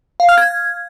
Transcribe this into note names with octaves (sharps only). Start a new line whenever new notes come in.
F5
F6
G#6